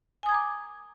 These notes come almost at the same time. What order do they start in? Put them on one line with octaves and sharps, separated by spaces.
G#5 D#6 G#6 A#5 D6